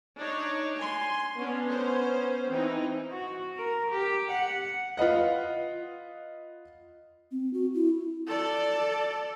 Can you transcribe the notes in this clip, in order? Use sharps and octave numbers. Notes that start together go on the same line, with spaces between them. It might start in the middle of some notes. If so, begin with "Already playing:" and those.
D4 D#4 C#5
G#5 C6
B3 C#4 D4
C#4 C5
E3 C4 D#4
F#4
A#4
G4
F#5
F4 B4 D#5 F#5
C4
F#4
E4
A4 D5